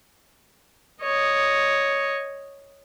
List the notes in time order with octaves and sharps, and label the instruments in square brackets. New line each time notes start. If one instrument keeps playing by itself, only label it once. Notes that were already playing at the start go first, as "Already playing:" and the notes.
[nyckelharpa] C#5 D#5